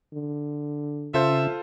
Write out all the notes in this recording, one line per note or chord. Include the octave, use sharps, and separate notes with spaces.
D3
C#3 C#4 F4 A4 C5 E5